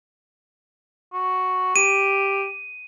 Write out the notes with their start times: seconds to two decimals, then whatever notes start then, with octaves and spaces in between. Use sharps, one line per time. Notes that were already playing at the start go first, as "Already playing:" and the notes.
1.13 F#4
1.76 G4 D#7